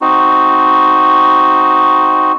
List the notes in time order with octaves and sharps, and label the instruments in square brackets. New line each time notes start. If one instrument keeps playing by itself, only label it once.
[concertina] C4 D#4 F#4